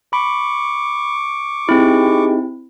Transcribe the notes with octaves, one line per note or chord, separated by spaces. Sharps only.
B5 C#6 D6
C4 D#4 E4 G4 G#4